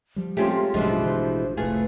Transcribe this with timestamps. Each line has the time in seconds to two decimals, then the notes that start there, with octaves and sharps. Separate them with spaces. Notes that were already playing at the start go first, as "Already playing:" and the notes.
0.16 F3 G3
0.37 G#3 A3 C4 C#4 F4 G4
0.74 A1 F#2 B2 D3 E3 F3 G#3
1.03 A1 D3 C5
1.57 F1 C2 A2 A3 F4 G#4 B4